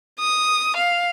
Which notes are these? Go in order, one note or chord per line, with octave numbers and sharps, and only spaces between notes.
D#6
F5